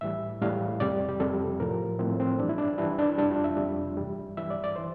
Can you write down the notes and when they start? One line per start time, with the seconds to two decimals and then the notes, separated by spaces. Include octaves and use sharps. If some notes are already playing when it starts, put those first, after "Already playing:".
0.01 A2 E3 G3 E5
0.41 A2 E3 G3 F5
0.80 F2 C3 G3 D5
1.09 G4
1.20 F2 C3 G3 A4
1.60 A2 F3 A#4
1.99 A2 F3 C4
2.20 C4
2.39 G2 E3 G3 D4
2.49 E4
2.58 D4
2.78 G2 E3 G3 E4
2.98 D4
3.18 F2 C3 G3 D4
3.31 F4
3.44 E5
3.57 F2 C3 G3
3.97 G2 E3 G3
4.37 G2 E3 G3 E5
4.50 D5
4.64 D5
4.76 E3 C5